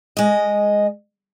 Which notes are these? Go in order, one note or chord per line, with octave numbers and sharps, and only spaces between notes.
G#3 D#5